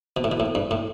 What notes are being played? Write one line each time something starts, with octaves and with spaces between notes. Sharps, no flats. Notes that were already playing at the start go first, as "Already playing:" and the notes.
B2
A2
B2
A2
G2
A2